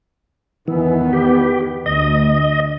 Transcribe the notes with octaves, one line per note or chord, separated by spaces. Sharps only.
E2 D#3 E3 B3
G4
D2 D#5